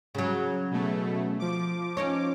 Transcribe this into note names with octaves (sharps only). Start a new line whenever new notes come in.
C#3 F#3
B2 A3
F3 D6
C#4 D#4 C#5